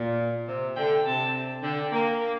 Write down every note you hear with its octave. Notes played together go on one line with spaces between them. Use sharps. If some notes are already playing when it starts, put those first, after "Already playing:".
Already playing: A#2
C3
D3 G5
C3 A5
D3 G5
A#3